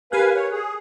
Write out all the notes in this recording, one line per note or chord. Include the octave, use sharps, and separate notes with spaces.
G4 A#4 B4 F5 G#5 F#6
C#5
G#4